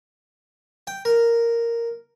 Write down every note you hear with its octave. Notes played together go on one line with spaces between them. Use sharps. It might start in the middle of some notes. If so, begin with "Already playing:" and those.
G5
A#4